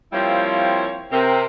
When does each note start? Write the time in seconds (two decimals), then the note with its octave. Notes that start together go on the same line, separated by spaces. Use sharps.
0.13 F3 G3 A#3 C4 E4 C#5
1.11 C3 C4 A#4